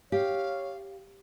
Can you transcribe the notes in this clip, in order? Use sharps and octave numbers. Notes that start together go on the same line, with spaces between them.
G4 C#5 F5